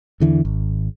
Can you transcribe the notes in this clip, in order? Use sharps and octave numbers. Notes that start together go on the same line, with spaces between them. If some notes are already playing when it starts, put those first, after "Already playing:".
E2 D3 E3
G#1